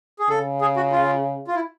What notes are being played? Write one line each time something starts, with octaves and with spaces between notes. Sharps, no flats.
G#4
C#3 A4
G#4
F#4
F4
F4
E4